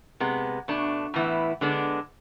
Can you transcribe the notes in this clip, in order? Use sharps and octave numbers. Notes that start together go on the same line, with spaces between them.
C3 G#3 B3
B2 A3 D4
A2 E3 B3 E4
D3 G#3 B3 D4